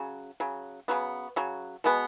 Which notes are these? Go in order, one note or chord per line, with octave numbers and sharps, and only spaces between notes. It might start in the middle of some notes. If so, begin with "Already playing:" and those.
Already playing: C#3 F#3
C#3 F#3
C#3 F#3 B3
C#3 F#3
B2 G#3 B3